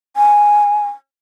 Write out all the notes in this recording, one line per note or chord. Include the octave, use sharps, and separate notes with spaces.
G#5